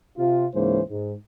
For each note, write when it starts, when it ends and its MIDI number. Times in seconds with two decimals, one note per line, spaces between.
0.18 0.47 48
0.18 0.47 65
0.55 0.81 37
0.55 0.81 44
0.55 0.81 52
0.55 0.81 58
0.55 0.81 61
0.55 0.81 72
0.91 1.13 44